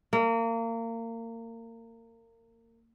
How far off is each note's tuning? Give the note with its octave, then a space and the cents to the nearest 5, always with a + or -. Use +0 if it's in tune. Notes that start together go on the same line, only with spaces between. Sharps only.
A#3 -30